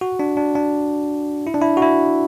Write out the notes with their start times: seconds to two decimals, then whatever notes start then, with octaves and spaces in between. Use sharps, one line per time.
0.01 F#4
0.20 D4
0.37 D4
0.55 D4
1.47 E4
1.54 D4
1.61 E4
1.77 F#4
1.82 E4